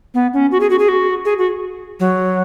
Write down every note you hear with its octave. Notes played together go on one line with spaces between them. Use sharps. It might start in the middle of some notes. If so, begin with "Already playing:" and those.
B3
C#4
F#4
G#4
F#4
G#4
F#4
G#4
F#4
F#3